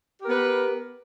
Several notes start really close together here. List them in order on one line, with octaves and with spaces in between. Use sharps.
G4 A#4 B3 B4